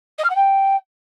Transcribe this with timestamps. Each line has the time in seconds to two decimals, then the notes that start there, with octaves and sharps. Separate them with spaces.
0.18 D#5
0.24 F6
0.29 F#5
0.35 G5